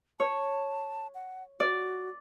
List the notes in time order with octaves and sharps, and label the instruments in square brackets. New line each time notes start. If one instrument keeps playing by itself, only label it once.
[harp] C#5 [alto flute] A5
[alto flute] F#5
[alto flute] F#4 [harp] D5